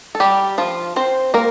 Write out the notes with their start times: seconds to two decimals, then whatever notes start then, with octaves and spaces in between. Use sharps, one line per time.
0.15 A4
0.20 G3 G4
0.58 F3 F4
0.96 C4 C5
1.34 A#3 A#4